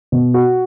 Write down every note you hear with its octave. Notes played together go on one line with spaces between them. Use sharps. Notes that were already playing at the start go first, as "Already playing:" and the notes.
B2
F#4